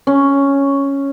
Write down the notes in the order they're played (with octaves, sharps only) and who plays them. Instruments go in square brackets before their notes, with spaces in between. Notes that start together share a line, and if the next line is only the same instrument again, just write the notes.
[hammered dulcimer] C#4